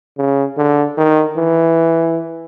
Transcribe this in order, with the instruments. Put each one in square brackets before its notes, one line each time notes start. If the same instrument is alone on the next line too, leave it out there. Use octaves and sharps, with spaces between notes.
[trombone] C#3
D3
D#3
E3